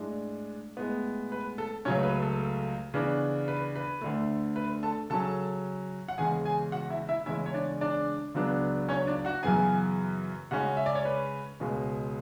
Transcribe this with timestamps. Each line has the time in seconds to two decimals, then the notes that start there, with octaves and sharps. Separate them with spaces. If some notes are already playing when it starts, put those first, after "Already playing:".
Already playing: A2 G#3 D4
0.77 A2 G#3 B3
1.32 B4
1.58 A4
1.85 C#2 C#3 F#3 A3 C#4 C#5
2.03 B4
2.22 A4
2.94 C#3 E3 B3 D4
3.48 B4
3.75 B4
4.01 D2 D3 A3
4.56 B4
4.83 A4 A5
5.10 C#3 F#3 C#4 A4 A5
6.08 F#5
6.18 E2 C#3 G#3 C#4 G#4 G#5
6.45 G#4 G#5
6.72 F#4 F#5
6.90 E4 E5
7.09 E4 E5
7.26 E2 C#3 G#3 C#4 E4 E5
7.46 C#5
7.54 D4 D5
7.81 D4 D5
8.34 C#2 C#3 F#3 B3 D4
8.89 C#4 C#5
9.07 D4 D5
9.25 F#4 F#5
9.43 F#2 C#3 E3 B3 G#4 G#5
10.51 C#3 G#3 C#4 F#4 F#5
10.77 E5
10.86 D5
10.95 C#5
11.05 B4
11.60 C#2 B2 G#3 C#4